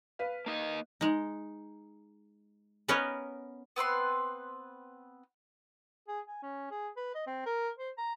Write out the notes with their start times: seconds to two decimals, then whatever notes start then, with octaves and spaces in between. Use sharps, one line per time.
0.19 B4 F5
0.46 A#3 D#4 D#5
1.01 G#3 D#4
2.88 B3 C#4 A#4 B4 C#5 D#5
3.76 B3 C4 B4 C6
6.08 G#4
6.28 G#5
6.42 C#4
6.71 G#4
6.97 B4
7.15 D#5
7.27 C4
7.46 A#4
7.78 C5
7.98 A#5